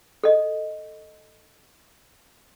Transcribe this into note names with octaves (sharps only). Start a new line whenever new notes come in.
A4 D#5